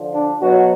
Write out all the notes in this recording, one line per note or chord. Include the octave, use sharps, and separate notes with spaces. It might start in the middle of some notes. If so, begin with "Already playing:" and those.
Already playing: D3 F3
D4
B2 F#3 F#4